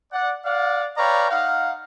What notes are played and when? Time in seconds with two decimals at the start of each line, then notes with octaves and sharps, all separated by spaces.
0.12 D5 F#5
0.45 D5 F5 F#5
0.97 B4 C#5 D5 F5 G5 A#5
1.30 D#4 F5 F#5